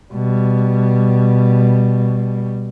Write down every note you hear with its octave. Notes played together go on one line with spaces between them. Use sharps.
B2 G3